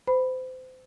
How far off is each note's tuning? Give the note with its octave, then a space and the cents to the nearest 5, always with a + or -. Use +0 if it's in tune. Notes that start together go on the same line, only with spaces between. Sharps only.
C5 -30 B5 +0